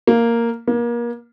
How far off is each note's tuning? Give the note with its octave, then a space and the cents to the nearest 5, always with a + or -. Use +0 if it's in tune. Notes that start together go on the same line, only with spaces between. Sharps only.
A#3 -5
A#3 +30